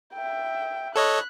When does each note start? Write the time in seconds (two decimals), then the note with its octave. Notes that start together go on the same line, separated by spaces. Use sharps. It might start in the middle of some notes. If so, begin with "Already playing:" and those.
0.14 E5 G5
0.96 A4 C#5 D#5 B5 F#6